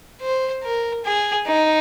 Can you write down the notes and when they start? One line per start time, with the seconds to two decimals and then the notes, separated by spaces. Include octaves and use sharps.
0.21 C5
0.63 A#4
1.05 G#4
1.46 D#4